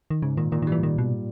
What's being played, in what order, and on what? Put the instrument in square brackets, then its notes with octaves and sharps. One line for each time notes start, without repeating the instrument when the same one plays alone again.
[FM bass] D#3
[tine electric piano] G#2 [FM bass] C#3
[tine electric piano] A#2 [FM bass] D#3
[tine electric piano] A#2 [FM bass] D#3
[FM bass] D#3
[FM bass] E3 [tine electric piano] G3
[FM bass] D#3
B2